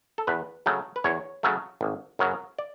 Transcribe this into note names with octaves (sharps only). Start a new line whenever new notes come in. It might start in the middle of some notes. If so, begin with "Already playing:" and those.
A4
E2 B4
C#3 F#3 A3
B4
E2 C#5
C#3 F#3 A3
G#1
F#2 C#3 F#3
D5